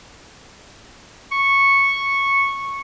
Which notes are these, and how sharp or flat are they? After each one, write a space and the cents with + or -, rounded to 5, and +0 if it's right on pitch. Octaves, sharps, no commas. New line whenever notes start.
C#6 -5